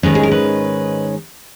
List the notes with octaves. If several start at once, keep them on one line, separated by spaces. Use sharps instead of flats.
G#2 D#3 G#3 C#4 B4
G#4
A#4
B4